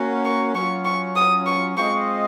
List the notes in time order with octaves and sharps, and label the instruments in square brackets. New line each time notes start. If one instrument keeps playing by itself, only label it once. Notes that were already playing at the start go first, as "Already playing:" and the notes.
Already playing: [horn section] A#3 C#4 F#4
[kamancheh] C#6
[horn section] F#3 C#4 F4 [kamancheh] C#6
[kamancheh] C#6
D#6
C#6
[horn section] G#3 C4 F4 C5 D#5 [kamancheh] C#6